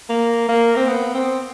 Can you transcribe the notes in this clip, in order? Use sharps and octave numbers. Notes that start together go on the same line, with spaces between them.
A#3
A#3
C4
B3
C4